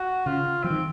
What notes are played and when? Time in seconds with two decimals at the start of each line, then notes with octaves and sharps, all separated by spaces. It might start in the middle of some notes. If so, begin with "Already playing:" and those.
Already playing: F#4
0.26 C#3 F4
0.64 F3 C4
0.70 D#3